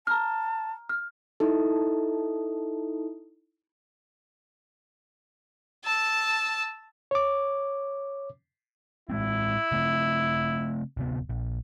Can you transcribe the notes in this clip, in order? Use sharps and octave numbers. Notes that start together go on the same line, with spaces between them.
A5 A#5 F6
F6
D#4 E4 A4
A5 E6
C#5 D6
A2 G#3 C4 E4
C#3 A3 C4
D1 C3 B3
A#1